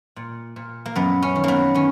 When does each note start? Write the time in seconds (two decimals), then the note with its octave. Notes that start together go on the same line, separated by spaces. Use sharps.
0.16 A#2
0.56 A#2
0.86 A#3
0.95 F#2 B3
1.22 C#4
1.35 D#3
1.44 A#3 B3
1.75 D#3 C#4